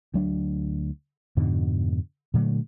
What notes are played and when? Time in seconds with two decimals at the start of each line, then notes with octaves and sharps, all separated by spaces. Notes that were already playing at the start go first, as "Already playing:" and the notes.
0.14 D2 F#3 D4
1.37 F2 G#2 B2 D3
2.34 A#2 D3 F#3 A3